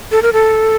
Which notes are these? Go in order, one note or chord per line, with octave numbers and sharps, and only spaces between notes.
A4
A#4
A4